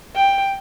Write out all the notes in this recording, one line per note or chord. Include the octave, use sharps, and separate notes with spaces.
G5